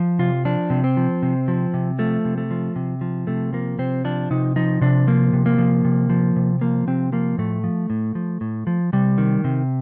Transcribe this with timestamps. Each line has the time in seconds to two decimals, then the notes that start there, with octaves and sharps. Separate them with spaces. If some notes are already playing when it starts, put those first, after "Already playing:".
Already playing: F3
0.19 C3 F4
0.45 F3 D4
0.70 C3
0.84 C4
0.97 F3
1.23 C3
1.48 F3
1.74 C3
1.99 F3 A3
2.25 C3
2.38 A3
2.51 F3
2.76 C3
3.01 F3
3.27 C3 A3
3.53 F3 A#3
3.79 C3 C4
4.04 F3 D4
4.30 C3 D#4
4.56 F3 D#4
4.81 C3 D4
5.07 F3 A#3
5.33 C3
5.46 A#3
5.58 F3
5.85 C3
6.10 F3
6.36 C3
6.61 F3 A#3
6.87 C3 C4
7.12 F3 A#3
7.38 A2 A3
7.64 F3
7.90 A2
8.15 F3
8.41 A2
8.67 F3
8.93 C3 G3
9.18 D#3
9.44 C3